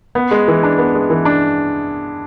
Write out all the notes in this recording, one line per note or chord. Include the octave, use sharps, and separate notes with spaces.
B3
G#3
E3
D4
B3
G#3
E3
D4